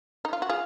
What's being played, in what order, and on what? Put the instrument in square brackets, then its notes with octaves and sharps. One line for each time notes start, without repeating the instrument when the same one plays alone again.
[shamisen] D#4
F4
F#4
[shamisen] F4 G#4 [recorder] F5